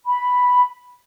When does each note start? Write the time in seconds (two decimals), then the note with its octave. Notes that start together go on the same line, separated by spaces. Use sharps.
0.06 B5